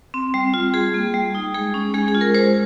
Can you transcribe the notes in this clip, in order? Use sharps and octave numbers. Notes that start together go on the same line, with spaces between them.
C4
G3
F4
G3 G#4
A#3
G3
D#4
G#3 G#4
C#4
G#3 G#4
G#4
F4
A#4
G#3 C5